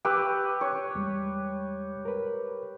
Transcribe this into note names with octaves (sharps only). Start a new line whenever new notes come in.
G4 B4 C#6 D6 E6
C#5
E2 G3 G#3
A#4 B4